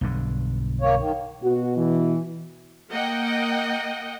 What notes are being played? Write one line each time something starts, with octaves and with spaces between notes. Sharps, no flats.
B1 G2 D3
A#3 C#5
D#3
B2 F#4
E3
A#3 D#5 F#5 G5